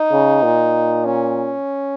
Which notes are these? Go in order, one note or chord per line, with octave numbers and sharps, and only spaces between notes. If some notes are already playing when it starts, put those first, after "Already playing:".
Already playing: D#4
C#3
A#2
C#4